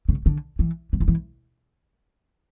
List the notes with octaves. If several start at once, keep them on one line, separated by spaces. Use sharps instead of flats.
C#3
D3
E3
E3
F3
E3